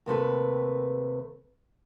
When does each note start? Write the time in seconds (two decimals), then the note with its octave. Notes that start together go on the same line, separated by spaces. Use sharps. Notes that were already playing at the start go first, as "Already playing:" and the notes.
0.06 D#2 C3 A3 B4